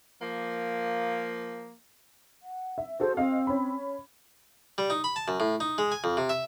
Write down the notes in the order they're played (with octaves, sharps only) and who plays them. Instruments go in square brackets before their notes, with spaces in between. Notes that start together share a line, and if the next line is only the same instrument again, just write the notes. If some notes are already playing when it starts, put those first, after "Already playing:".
[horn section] F3 A#3
[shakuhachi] F#5
[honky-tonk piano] E5
[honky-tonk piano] F#4 G#4 A4 [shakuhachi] C5
[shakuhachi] C4 [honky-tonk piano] D#5 F5
[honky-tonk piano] C#4 B5
[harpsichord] G3
D#4
B5
A5
F#2
A2
D#4
G#3
G#5
F2
C3
E5